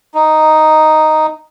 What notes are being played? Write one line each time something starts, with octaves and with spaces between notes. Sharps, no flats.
D#4